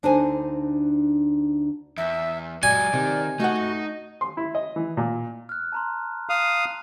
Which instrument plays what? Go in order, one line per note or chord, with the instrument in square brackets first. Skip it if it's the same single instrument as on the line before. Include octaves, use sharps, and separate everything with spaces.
[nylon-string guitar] D2 D4 D#4 C5 G#5
[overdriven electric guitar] E2 [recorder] E5
[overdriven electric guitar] F#3 G#3 [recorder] D5 [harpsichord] G#5
[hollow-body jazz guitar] C3 [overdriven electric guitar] D#3
[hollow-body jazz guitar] A3 F#5 [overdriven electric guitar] D#4 [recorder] F#4
[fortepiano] C6
E4
D#5
E3
A#2
[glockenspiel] F6 F#6
A5 A#5 C6
[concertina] F5 D#6